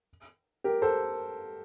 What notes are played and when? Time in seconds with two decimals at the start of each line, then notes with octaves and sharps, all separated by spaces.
0.64 G4 A#4
0.82 A4 C5